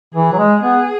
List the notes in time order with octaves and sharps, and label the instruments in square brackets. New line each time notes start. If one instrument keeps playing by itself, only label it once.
[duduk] E3 [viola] G#4
[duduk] F#3
G#3
[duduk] B3 [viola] G#4